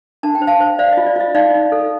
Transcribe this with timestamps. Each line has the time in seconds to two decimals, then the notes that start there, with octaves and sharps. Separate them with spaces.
0.23 D4 A5
0.35 G5
0.42 C5
0.47 F5 A5
0.60 C5
0.79 C5 D5 F5
0.92 D#5
0.97 F4
1.06 D5
1.16 F4 D#5
1.35 D#4 D5 F5
1.54 D#4
1.72 A4